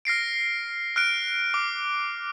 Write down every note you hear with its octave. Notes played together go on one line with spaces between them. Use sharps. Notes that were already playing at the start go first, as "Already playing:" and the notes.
F6 A#6 C7 D7
F6 F#6 D7
D6